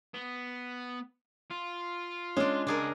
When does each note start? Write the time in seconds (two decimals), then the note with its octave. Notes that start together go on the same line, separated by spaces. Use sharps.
0.14 B3
1.51 F4
2.37 G#3 C#4 D4
2.67 C#2 D4 G#4 A#4